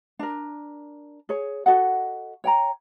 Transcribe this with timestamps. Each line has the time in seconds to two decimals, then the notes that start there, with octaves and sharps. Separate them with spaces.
0.19 D4 A#4
1.29 G#4 C#5
1.66 F#4 A4 D#5 F#5
2.44 C#5 G5 A#5